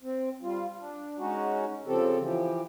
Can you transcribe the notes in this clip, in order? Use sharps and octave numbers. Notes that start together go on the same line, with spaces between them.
C4
G3 F4
D4
G#3 C#4 D#4 F#4
C#3 F3 C4 G4 A4
E3 F3 G4